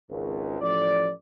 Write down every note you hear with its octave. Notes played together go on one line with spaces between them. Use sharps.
G#1 C#2
A1 A2 F3 D5